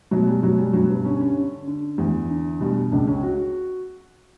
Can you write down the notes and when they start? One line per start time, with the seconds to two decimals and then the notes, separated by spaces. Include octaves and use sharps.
0.11 B2 F#3
0.27 G3
0.43 B2 F#3
0.58 G3
0.73 G2 F#3
0.90 B3
1.05 D3 C#4
1.21 C#4
1.36 D3
1.67 D3
1.98 E2
2.30 D3
2.60 B2 G3
2.92 C#2 D4
3.07 C#4
3.23 F#4